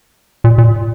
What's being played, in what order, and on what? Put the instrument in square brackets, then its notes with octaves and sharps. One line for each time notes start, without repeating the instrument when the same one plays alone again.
[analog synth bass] A#2
A#2